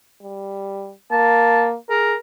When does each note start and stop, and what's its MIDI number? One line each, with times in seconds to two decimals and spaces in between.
0.22 0.92 55
1.11 1.76 58
1.11 1.64 81
1.90 2.14 68
1.90 2.15 70